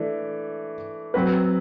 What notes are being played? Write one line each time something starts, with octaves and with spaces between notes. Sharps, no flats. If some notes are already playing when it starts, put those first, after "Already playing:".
Already playing: E3 A3 D4
F#3 C4 F#4 B4